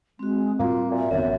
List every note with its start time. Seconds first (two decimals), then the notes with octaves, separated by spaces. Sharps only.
0.19 G#3 C4 F#4
0.59 A2 G3 A#3 F4
0.91 A#2 E5
1.11 F1 F#2 D#3 B3 C4
1.24 A1